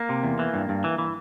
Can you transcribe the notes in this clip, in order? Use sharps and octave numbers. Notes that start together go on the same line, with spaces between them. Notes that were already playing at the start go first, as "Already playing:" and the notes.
Already playing: A#3
C3
E2
E3
G2
G2
E3
E3